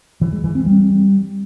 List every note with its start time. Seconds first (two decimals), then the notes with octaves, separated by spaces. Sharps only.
0.21 E3
0.33 G#3
0.44 E3
0.55 C4
0.66 G3